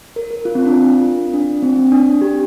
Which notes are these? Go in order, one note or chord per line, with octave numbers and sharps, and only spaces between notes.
A#4
A#4
F4
C4
D4
F4
D4
C4
D4
G4